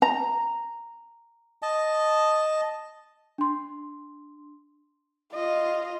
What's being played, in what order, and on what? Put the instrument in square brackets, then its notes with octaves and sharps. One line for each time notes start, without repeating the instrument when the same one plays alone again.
[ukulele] A#5
[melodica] D#5 A5
[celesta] D4 C6
[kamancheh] F4 [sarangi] D#5